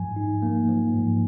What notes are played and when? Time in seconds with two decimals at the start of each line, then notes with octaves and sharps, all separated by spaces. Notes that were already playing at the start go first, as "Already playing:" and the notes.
Already playing: G#2 F3 G#5
0.16 D#4
0.42 A#3
0.68 F3
0.94 G#2